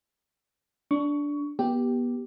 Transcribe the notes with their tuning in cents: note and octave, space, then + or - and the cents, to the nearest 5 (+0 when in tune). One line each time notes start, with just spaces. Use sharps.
D4 -10 C#6 +20
B3 -30 G4 +0